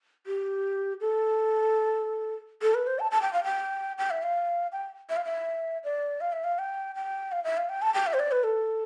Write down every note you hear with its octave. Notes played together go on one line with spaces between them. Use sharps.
G4
A4
A4
B4
C5
A5
A5
G5
F5
G5
G5
E5
F5
G5
E5
F5
E5
D5
F5
E5
F5
G5
G5
F5
E5
F5
G5
A5
G5
E5
C5
D5
B4
A4